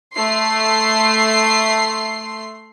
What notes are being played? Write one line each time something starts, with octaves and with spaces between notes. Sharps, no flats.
A3 C6 C7